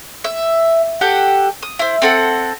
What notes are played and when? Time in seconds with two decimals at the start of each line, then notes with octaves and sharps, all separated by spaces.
0.24 E5
1.01 G4 A4 F#5 G5
1.63 D#6
1.79 E4 C5
2.02 C4 A4 F#5